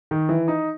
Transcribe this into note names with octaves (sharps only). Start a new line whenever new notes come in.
D#3
E3
D#4